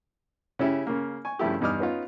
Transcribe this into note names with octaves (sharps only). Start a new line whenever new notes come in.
C#3 C#4 E4 G4
C#3 A#3
G#5 C#6
G2 C#3 F3 A3 E4 G4
E2 G2 D#4 D6 D#6 F6
B3 C#4 D#4 F4